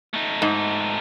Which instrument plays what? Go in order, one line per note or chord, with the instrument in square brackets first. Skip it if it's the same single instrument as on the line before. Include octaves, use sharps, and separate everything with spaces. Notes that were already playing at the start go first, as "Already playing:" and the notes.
[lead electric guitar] A3 D#4
[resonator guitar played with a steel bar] G#2